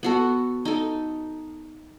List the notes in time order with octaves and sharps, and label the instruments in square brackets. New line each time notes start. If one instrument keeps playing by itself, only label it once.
[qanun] B3 F#4 A4
D#4 A4